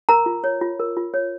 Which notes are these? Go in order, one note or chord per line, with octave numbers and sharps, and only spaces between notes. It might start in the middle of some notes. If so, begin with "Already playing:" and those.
A#4 A#5
F4
C#5
F4
A#4
F4
C#5